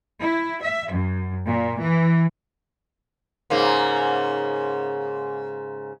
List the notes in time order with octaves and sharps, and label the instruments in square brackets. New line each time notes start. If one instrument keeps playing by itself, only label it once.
[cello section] E4
E5
F#2
A#2
E3
[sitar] G#2 C#3 A#3